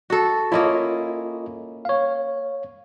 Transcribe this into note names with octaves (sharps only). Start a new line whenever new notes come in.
F#4 A4
A#3 C#4 E4 F4 A4 D#5
C#5 F5